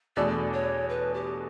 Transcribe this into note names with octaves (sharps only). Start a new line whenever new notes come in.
E2 B2 A3 D4 A4 D5
C#5
B4
G4